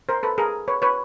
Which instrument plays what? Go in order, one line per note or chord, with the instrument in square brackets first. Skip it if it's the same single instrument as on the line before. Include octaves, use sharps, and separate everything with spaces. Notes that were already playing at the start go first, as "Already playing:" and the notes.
[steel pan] A#4 C5
A4 B4
G#4 A#4
B4 C#5
B4 C#5